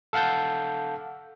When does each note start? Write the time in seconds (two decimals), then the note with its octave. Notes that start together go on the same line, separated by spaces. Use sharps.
0.13 A4 F5 F#5 A5 G6